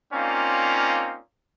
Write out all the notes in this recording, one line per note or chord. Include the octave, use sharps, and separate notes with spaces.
A#3 C4 C#4 D#4 F4 D5